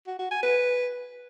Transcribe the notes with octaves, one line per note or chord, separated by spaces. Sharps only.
F#4
F#4
G#5
B4